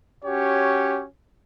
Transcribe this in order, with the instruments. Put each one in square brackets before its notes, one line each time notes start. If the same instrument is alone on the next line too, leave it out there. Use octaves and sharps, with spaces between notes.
[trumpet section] C#4 F#4 G4 C#5